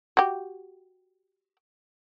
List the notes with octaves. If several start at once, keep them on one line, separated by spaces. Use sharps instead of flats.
F#4 G4